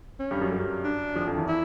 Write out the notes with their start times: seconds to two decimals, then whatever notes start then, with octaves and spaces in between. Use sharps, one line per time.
0.20 C#4
0.31 G2 G3
0.41 F#2 F#3
0.52 F#2 F#3
0.84 D4
1.16 F2 F3
1.26 F2 F3
1.37 E2 E3
1.48 E4